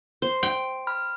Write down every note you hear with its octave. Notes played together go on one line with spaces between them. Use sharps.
C5
G5
B5 F6